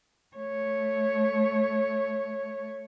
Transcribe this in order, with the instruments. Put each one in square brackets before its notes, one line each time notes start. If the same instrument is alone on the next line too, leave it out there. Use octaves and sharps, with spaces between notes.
[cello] A3 C#5